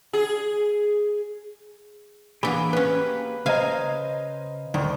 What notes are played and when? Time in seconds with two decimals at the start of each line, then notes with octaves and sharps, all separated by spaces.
0.13 G#4
2.43 E3 A#3 B3 D4 G4 G#4 B5
2.73 B3 C#4 B4
3.46 C#3 C5 D#5 F5 G#5 A#5
4.74 D2 D#3